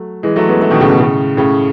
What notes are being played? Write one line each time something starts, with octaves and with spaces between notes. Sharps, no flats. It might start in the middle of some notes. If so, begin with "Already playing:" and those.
Already playing: F#3 A3
E3 G#3
F#3 A3
G#3 B3
F#3 A3
B2 D#3
A2 C#3
B2 D#3
A2 C#3
A2 C#3